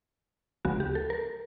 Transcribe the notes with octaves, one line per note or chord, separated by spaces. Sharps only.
D2 C#3 F3 G#3 B3 F#4
G4
A4
A#4